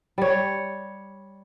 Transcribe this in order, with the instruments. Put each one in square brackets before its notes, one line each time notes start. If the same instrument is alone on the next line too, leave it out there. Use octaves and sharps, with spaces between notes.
[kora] G3 C#5